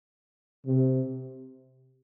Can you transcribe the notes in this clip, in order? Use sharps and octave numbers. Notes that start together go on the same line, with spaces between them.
C3